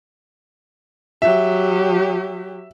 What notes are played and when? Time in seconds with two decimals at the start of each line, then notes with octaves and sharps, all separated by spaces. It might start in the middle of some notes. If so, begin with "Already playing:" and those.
1.22 F#3 G4 E5